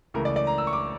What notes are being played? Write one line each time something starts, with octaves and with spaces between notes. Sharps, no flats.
C#2 C#3 E3 A3 A#4
D5
D5
A#5
E6
C#6
D6